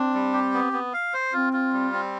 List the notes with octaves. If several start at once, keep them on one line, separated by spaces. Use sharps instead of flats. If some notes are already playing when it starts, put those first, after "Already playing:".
Already playing: C4 D4
G3
G4
B3
B3
F5
C5
C4 F4
F4
G3
C4